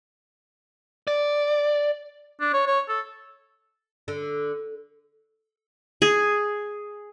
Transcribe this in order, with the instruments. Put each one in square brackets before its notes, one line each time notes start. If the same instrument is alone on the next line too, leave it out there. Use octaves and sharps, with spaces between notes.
[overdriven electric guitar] D5
[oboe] D4
C#5
C#5
A4
[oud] D3
[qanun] G#4